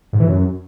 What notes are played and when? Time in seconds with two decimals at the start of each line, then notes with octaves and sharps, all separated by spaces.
0.13 G#2
0.20 E3
0.27 F#2